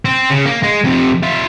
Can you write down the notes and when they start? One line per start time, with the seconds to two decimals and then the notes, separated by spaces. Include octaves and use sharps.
0.05 C4
0.30 C#3
0.45 A#3
0.63 G#3
0.84 F2 C3
1.23 F4 E5